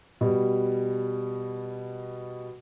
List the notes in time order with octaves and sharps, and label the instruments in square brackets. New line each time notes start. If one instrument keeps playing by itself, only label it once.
[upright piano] B2 G3